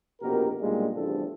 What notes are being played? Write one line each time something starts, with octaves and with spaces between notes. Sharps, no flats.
A#1 F2 B2 G4 A#4
B1 G2 A#2 G3 G#3
A1 E2 G2 C3 F3 A4